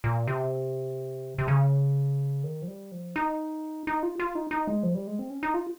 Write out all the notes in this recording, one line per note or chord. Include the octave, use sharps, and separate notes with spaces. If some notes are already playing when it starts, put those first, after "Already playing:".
A#2
C3
C3
C#3
D#3
F3
G3
F3
D#4
D#4
F4
F4
D#4
D#4
G#3
F3
G3
G#3
C4
C#4
D#4
F4